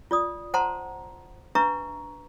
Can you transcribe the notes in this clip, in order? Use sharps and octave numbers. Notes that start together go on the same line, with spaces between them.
F4 D5 D#6
C5 F#5 A5 A#5 C6
D4 B4 E5 A#5 C#6